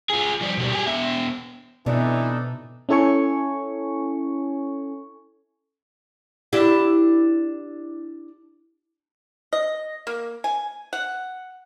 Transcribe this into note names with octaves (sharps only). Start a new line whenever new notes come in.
F4 G#4
F3 G3
B2 G3
G4 G#4
B2 E5
B2 E3 B3 C4 D4 D#4 A4 D5
C#4 E4 A4 C#5 G#5 C#6
D4 E4 G4
D#5
A#3
G#5
F#5